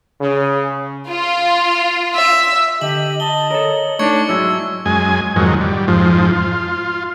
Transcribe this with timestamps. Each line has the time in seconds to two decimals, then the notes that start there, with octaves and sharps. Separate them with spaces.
0.20 C#3
1.09 F4
2.14 E5
2.82 D3 G4 D#5 F#7
3.20 D#5 A5 G7
3.51 A4 A#4 C#5
3.99 A3 D4 D#4 C#5 C#6 G#6 C#7
4.29 G#2 F#3 G#3 E4 E6
4.86 F#2 G#3 G#5
5.36 F2 G#2 D#3 F#3
5.61 G3
5.88 F2 G#2 F3
6.33 F4